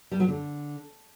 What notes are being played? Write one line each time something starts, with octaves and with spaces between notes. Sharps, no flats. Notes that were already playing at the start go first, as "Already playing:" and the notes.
G3
F#3
D3